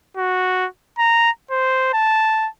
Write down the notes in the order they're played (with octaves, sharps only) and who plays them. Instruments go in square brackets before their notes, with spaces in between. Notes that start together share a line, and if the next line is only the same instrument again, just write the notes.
[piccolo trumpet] F#4
A#5
C5
A5